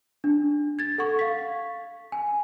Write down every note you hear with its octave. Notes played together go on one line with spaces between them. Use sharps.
D4
G#6 A6
A4 F#5 C#6
F5 B6
G#5